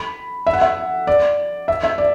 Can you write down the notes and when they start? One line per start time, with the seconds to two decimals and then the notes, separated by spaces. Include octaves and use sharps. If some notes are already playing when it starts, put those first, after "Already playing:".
Already playing: B5
0.47 E5
0.53 F#5
0.61 E5
1.07 D5
1.68 E5
1.83 E5
1.98 D5